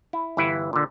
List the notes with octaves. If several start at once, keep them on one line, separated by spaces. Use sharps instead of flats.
E4
G1 E3 E4 B4
A#2 D3